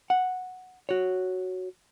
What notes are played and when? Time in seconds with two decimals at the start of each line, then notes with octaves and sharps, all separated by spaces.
0.10 F#5
0.89 F#4 C#5